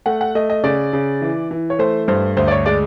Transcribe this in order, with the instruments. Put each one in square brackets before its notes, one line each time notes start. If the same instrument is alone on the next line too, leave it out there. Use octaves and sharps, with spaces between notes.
[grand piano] A3 F#5
F#5
A3 D#5
D#5
C#3 D5
C#3
E3
E3
C#5
A3 C5
G2 C5
D2 C5
D5
C#5
G#3 D5